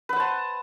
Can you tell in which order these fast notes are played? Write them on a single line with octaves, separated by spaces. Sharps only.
B4 F#5 C5 A5